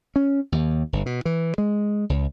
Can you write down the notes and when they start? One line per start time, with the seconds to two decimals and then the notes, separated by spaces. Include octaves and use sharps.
0.16 C#4
0.52 D#2
0.93 G1
1.06 B2
1.25 E3
1.58 G#3
2.10 C#2